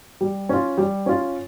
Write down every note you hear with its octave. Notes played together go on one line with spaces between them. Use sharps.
G3
C#4 F4
G3
C#4 F4